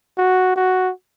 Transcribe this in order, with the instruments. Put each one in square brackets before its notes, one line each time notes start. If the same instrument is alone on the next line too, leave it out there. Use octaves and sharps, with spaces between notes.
[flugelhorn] F#4
F#4